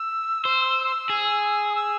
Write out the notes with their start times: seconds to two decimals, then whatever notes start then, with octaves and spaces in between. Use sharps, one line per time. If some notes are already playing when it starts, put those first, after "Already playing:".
Already playing: E6
0.45 C5
1.09 G#4
1.70 D#6
1.75 E6